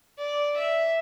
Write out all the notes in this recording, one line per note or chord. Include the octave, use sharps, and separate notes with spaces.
D5
E5